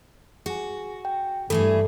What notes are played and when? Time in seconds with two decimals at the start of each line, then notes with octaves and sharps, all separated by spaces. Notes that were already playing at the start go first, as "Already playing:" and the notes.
0.46 F#4 G#4 G#5
1.05 G5
1.50 G2 E3 G3 A3 G#4 A4